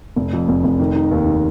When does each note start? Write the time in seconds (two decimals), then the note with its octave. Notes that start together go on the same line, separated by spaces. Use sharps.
0.16 F1
0.33 F2
0.48 F1
0.64 F1
0.79 D#3
0.95 D#4
1.11 D#2
1.26 D#4